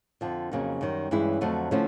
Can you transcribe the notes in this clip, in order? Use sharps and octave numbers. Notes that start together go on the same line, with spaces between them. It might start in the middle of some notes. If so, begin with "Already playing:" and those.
F2 D3 F3
F2 C#3 F#3 A#3 D#4
F#2 D#3 G3
G2 E3 G#3 C#4 E4
F2 D3 F#3 A3
D3 F3 A3 C#4 E4